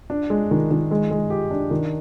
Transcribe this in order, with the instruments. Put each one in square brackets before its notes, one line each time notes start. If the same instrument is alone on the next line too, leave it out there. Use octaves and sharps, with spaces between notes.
[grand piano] D4
G#3
D#3
D#3
G#3
G#3
G4
D4
D#3